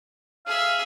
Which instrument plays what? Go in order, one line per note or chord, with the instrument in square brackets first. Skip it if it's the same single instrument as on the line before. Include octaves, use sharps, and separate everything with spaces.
[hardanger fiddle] G#4 E5 [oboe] F5